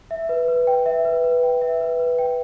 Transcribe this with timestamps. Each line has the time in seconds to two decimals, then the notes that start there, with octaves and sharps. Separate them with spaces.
0.11 E5
0.29 B4
0.48 B4
0.67 G5
0.86 E5
1.05 B4
1.24 B4
1.43 G5
1.61 E5
1.81 B4
1.99 B4
2.18 G5